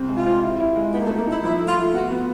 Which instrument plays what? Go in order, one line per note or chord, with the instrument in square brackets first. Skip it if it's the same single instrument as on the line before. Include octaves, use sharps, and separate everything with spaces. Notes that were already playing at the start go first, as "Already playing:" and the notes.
Already playing: [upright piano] C2 C4
G#3
[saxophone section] F4
[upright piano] C4
E4
E4
G#3
[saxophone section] B3 [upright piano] D#4
[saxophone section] A#3
A3
[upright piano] D#4
[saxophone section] A#3
[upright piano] D#4 [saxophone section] E4
[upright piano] F3 [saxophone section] E4
[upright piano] A3
[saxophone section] F4
[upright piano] A3
[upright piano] B3 [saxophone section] F#4
[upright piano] B3